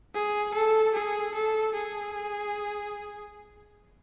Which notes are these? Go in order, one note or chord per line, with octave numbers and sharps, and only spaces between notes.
G#4
A4
G#4
A4
G#4